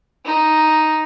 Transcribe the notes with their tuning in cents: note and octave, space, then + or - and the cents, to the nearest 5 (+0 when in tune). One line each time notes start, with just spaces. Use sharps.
D#4 +0